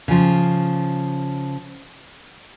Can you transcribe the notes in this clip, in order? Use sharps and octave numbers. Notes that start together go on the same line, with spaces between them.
C#3 F3